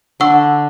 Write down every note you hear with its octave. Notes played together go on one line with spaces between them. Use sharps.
D3 D4 F#5 C#6 E6